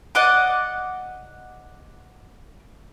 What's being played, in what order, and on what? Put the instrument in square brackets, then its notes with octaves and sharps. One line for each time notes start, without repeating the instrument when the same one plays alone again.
[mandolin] D5 D#5 F#5 D6